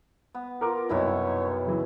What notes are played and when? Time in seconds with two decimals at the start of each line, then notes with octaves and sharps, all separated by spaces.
0.35 B3
0.61 F4 A#4 A#5 D6
0.89 C2 F#2 B2 D#4 E4 C#5 B5
1.66 C#3 E3 F#3